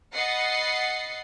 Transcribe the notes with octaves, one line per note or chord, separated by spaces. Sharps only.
D#5 F#5 B5 A6 C7 C#7